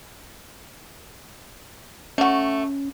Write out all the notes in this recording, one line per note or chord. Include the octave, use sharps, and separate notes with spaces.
A3 C#4 F#4